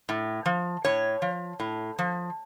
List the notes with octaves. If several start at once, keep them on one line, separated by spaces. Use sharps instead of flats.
A2
F3
A2 C#5
F3
A2
F3